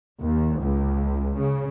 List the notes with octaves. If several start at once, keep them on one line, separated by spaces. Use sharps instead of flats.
D#2
C#2
C#3